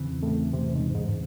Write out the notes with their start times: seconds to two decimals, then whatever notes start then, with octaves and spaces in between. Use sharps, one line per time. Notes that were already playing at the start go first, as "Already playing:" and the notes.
Already playing: E2 C#3 E3 C4
0.23 A2
0.53 C3
0.74 G#2
0.94 G#2